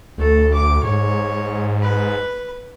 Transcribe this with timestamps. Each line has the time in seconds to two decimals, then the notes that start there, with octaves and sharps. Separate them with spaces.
0.18 D2 A3 A4
0.54 D6
0.83 G#2 C#5
1.81 B4